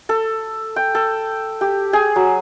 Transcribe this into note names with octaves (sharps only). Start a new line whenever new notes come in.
A4
G5
A4
G4
G#4 G#5
F#3